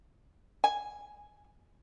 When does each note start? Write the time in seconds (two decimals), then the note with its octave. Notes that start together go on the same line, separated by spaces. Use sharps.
0.64 G#5